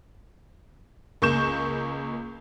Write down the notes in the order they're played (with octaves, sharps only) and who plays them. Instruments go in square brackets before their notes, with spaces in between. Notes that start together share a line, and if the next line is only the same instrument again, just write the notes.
[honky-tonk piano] C#2 A#3 C#6 G6 E7